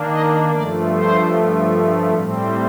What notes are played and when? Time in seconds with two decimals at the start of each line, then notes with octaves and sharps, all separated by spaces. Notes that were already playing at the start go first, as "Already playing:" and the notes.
Already playing: D#3 A#3 D4
0.10 D#5
0.51 G2 F3 A3 D5
0.92 C5
2.14 A2 G3 C4